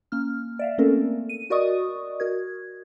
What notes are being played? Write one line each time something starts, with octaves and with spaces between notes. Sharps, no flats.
A#3 C#4 F6
D5 E5 F5
A3 A#3 C4 C#4 A4 A#4
D#7
F#4 A#4 D5 D#5 C#6 D#6
F#4 A#4 G#6